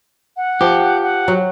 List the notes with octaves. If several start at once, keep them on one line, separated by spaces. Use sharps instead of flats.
F#5
F3 G4
F#5
F#3